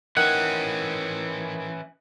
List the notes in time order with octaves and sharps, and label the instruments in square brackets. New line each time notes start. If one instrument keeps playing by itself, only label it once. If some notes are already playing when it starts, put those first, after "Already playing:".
[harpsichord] D#3 [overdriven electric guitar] E3 C#4 [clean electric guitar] F#5